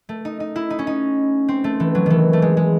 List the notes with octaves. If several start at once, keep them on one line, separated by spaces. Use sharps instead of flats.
A3
D#4
D#4
E4
D#4
C#4
D#4
C4
A3
E3
F#3
D#3 E3
A3
G#3
G#3